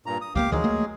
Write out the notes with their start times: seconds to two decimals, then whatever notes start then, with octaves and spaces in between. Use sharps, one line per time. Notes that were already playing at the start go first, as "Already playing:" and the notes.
0.06 G2 A#2 A#5
0.21 D#6
0.35 C#2 F#3 A#3 G4 F5 D6
0.52 D2 D#3 E3 F#3 G#3 G#4
0.64 A3 A#3